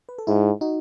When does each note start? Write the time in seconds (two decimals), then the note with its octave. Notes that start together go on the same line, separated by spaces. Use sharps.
0.09 B4
0.18 A4
0.27 G#2 E4 G#4
0.61 D#4 F#4